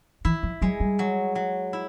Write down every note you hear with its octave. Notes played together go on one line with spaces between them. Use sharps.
E3 E4
F3
F#3 G#3
G3
F#3
F#3
E4